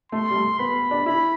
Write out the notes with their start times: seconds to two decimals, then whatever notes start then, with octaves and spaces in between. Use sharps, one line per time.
0.12 A3 C6
0.31 G3
0.35 A3
0.59 B3 B5
0.91 D4
1.06 E4 B5